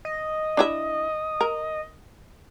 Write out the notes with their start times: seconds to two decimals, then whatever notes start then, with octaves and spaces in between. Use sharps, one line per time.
0.05 D#5
0.57 D4 E4 E5
1.41 A#4